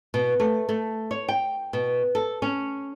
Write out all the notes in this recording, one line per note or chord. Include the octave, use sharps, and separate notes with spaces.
B2
A3
A3
C#5
G5
B2
A4
C#4